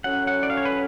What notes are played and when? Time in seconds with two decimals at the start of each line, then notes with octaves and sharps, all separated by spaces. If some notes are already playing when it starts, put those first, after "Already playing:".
0.04 A2 F#3 C#4 F#5
0.27 F#5
0.43 D5
0.50 F5
0.57 C#5
0.65 B4